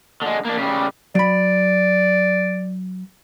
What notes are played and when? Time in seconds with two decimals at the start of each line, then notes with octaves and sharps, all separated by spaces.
0.22 D3 G#3
0.45 A#3 D4
0.57 C#3 G3
1.15 F#3 D5 B5